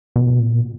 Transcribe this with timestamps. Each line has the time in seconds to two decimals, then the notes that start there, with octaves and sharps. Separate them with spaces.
0.16 B2
0.39 A#2